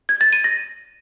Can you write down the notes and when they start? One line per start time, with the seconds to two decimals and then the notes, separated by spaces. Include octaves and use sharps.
0.09 G#6
0.21 A6
0.33 D#7
0.44 A#6